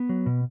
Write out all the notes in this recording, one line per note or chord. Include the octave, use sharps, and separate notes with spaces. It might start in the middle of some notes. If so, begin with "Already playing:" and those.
Already playing: B3
F#3
B2